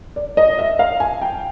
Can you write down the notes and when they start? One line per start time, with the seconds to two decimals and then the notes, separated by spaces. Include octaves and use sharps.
0.16 D5
0.37 D#5
0.59 E5
0.79 F5
1.00 G#5
1.21 G5